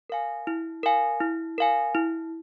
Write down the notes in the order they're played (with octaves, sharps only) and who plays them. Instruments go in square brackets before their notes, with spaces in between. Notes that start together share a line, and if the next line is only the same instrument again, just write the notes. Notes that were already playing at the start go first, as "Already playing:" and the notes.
[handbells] A#4 F5 G#5
E4
A#4 F5 G#5
E4
A#4 F5 G#5
E4